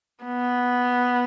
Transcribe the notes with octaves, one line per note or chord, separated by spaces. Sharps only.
B3